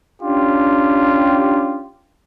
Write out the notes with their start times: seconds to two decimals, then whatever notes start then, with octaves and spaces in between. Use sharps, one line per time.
0.23 C#4 D4 F4 G4